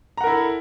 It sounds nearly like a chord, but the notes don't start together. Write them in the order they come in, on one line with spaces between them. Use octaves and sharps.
A#5 F#5 A#4 E4 A4